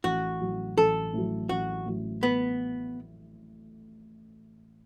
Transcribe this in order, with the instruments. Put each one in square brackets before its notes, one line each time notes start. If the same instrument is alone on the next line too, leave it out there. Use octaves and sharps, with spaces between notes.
[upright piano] A1 [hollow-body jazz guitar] F#4
[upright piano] A2 F#3
[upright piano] A1 [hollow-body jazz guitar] A4
[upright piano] A2 F#3
[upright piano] A1 [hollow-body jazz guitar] F#4
[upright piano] A2 F#3
[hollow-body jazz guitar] B3